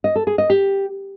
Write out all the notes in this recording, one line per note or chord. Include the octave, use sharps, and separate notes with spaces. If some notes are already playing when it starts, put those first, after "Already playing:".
D#5
A4
G#4
D#5
G4